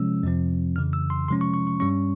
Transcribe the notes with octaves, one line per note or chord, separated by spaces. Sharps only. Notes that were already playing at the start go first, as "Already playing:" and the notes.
Already playing: C3 F3 G#3 C#4 E6
F2 C3 F3 C4
F2 C#3 E3 F6
E6
C6
C3 F3 G#3 C#4 C6
C#6
C#6
C#6
G2 G3 C#4 C#6